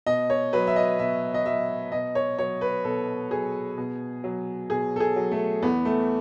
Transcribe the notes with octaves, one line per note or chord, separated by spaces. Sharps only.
B2 D#5
C#5
F#3 B4
E5
D#5
B2 E5
D#5
F#3 E5
B2 D#5
C#5
F#3 C#5
B4
B2 A4
F#3 G#4
B2
F#3
B2 G#4
A4
G#4
F#3
A3
E2 B3
A3